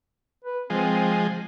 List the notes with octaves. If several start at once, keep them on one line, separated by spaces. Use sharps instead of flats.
B4
F3 G#3 C4